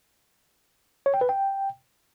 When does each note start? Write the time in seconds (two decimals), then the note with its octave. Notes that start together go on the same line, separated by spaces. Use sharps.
1.06 C#5
1.14 G5
1.21 B4
1.29 G5